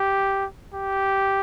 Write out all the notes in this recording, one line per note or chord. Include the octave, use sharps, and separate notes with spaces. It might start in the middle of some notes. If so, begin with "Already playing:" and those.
Already playing: G4
G4